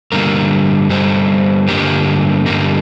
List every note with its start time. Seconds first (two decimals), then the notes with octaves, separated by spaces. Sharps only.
0.12 G2 D3 G3 A#3 A#4
0.90 G2 D3 G3 C5
1.68 G2 D3 G3 A#3 G4
2.46 G2 D3 G3 A#3